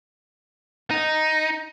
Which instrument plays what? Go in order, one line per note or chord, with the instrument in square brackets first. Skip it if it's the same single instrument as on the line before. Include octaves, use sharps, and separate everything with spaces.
[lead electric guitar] D#4